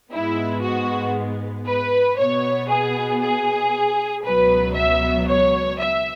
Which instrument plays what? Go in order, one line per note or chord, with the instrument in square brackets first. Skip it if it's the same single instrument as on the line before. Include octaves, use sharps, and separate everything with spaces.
[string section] G#2 G#3 B3 E4
F#4
B4
B2 B3 C#5
G#4
G#4
C#2 B2 F#3 B3 B4
E5
C#5
E5